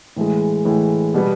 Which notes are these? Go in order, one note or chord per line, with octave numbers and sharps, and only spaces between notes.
A2 E3 G#3
A2 E3 G#3
B2 G3 B3